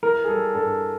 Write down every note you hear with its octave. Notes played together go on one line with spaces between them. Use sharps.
E3 A#4
G#4
G3 A4
G2 A4